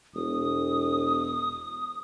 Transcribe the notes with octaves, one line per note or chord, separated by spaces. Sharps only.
E1 D#6